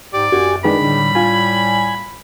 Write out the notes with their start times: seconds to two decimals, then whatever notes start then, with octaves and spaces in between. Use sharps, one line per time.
0.14 G#2 G4 D5
0.32 F#2 F#4 G4 G#5
0.64 D#3 G#3 D4 B4 B5
0.82 A2 D3 G3
1.15 F4 G#5